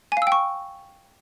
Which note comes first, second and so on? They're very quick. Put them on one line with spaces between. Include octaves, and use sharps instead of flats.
G#5 F5 E6 G5 C#6